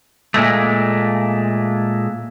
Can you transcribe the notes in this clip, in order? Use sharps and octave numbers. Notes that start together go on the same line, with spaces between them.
A#2 G#3 A3